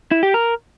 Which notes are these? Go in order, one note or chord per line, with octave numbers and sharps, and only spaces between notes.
E4
G4
A#4